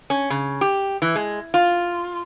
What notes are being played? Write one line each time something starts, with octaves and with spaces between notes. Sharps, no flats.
C#4
C#3
G4
E3
G#3
F4